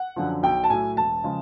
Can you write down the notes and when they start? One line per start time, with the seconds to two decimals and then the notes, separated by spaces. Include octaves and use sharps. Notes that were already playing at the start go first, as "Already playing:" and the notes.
Already playing: F#5
0.16 F#2 D3 F3
0.43 B1 G5
0.64 A5
0.70 A2 F#3 G#5
0.97 E1 A5
1.24 C#3 F3 G#3